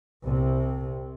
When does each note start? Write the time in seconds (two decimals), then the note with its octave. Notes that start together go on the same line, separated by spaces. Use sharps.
0.24 C2 C3